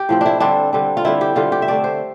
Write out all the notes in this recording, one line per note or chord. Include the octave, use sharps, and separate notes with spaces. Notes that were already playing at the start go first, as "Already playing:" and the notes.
Already playing: G4
A2 F3 C4
D4 E4
D3 G3 C4 D4
D3 G3 C4
F4
D3 G3 C4 E4
G4
D3 G3 C4 F4
G4
E5
D3 A3 C4 D5
C5